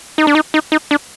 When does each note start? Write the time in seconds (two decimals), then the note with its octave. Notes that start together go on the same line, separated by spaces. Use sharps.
0.18 D#4
0.27 D4
0.35 D#4
0.54 D#4
0.72 D#4
0.91 D4